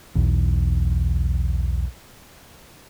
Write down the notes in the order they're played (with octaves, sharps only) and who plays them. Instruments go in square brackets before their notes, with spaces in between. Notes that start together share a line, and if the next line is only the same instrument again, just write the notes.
[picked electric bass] B1 E2